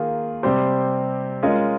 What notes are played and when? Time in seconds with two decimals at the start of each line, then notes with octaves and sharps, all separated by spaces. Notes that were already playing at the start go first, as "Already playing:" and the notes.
Already playing: D#3 A#3 F4 G#4
0.43 C3 G3 C4 G4 C5
1.43 G#3 C#4 F4 A#4 D#5